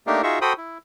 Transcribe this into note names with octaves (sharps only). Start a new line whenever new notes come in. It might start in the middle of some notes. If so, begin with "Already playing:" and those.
A3 A#3 D4 D#4 G4 A#4
D#4 F4 F#4 G#4 E5 C#6
F#4 A4 C5 G5 B5 D#6
E4